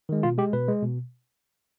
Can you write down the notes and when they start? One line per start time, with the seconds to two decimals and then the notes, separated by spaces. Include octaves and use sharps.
0.09 D#3 G#3
0.23 B2 F4
0.38 G#3 G4
0.53 B2 B4
0.68 G#3
0.82 B2